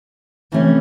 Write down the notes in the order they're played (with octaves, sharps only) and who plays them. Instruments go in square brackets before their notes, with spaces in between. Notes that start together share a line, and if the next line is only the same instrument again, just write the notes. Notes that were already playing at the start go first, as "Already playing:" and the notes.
[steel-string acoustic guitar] C3 E3 A3 C#4